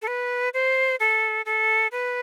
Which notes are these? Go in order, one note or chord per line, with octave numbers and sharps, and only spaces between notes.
A4
B4
C5
A4
A4
B4